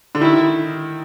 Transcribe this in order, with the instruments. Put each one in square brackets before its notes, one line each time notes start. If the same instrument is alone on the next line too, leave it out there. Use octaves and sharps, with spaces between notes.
[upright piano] D3
[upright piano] D#3 [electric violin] E4